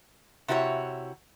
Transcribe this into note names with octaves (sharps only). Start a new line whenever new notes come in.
C3 E4 F#4 G4 C#5